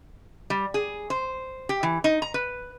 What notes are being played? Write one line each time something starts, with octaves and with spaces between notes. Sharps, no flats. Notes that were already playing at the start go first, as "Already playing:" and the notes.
G3
G#4
C5
G4
E3
D#4
A#5
B4